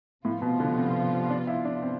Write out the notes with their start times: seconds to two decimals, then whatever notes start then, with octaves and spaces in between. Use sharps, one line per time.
0.25 A2 C3 F3 B3 F4
0.42 B2
0.60 D3
0.77 C4
1.30 D4
1.47 E4
1.65 D4
1.82 C4